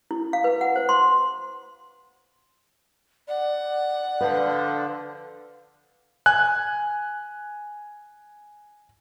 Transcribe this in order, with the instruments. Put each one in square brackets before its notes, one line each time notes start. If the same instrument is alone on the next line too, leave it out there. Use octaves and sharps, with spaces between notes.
[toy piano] E4
F5
B4
F#5
C5
C6
[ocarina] D5 [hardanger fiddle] F#5
[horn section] D3 F3 [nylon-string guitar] B4
[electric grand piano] G#5 F#6